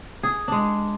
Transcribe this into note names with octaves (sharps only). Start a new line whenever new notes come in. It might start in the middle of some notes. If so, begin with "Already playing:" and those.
G#4
G#3 D4